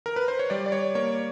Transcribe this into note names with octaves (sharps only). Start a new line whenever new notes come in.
A#4
B4
C5
C#5
G3 D5
D5
C#5
A#3 C#5